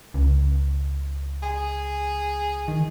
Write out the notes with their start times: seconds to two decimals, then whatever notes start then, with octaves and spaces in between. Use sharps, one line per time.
0.14 C#2
1.43 G#4
2.68 D#3